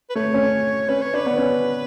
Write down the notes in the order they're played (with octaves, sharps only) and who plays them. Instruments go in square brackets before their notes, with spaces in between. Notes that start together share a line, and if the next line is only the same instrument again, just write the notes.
[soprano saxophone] B4
[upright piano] A3 [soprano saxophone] C#5
[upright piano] C#4
[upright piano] C#4 [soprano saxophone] B4
[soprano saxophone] C#5
[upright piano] D4 [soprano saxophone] B4
[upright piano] B3
C#4